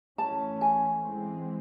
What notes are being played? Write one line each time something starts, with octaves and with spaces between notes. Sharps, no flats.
E3 A3 C#4 A5
G#5
E3 G#3 C4